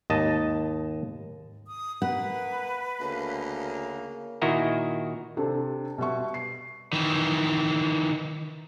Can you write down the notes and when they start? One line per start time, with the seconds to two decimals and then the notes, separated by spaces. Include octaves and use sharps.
0.10 D#2 G#2 D#5 A5
1.67 D#6
2.02 A#3 B4 F#5
3.00 D2 C#3 A#3
4.42 A#2 D#3 E4 F#4 D#5 A#5
5.37 C3 D4 A4
5.98 B2 G3 E5 C#6
6.34 C7
6.93 D#3 E3